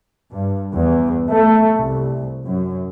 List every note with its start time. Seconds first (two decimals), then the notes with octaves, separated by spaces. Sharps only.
0.31 G2
0.74 E2
1.29 A3
1.77 C2
2.46 F#2